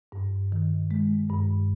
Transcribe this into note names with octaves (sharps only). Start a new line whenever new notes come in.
G2
D#3
G#3
G2